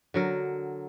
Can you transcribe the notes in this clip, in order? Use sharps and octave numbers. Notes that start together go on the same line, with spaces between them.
D3 F#3 A#4